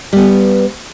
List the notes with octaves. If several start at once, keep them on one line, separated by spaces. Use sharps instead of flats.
G3 B3